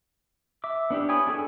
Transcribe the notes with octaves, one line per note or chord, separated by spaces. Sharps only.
E5 D6
B3 D4 E4 G4
C#5 G5 G#5 B5 D#6
D4 G#4 A4 B4 G#5